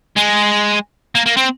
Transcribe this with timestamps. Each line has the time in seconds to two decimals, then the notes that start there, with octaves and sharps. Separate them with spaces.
0.17 G#3
1.15 A#3
1.26 A#3
1.37 C4